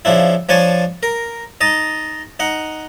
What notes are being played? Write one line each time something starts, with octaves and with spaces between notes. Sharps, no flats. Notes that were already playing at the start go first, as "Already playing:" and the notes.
C#3 F3 D4 E4
F3 D4 C#5 G#5 A5
A#4
D#4 D#5 A5
D#4 F#5